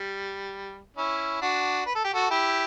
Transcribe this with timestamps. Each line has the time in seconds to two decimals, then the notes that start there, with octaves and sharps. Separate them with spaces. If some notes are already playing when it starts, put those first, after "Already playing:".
Already playing: G3
0.97 C#4 E4
1.41 D4 F#4
1.86 B4
1.95 A4
2.04 G4
2.14 F#4 A4
2.30 E4 G4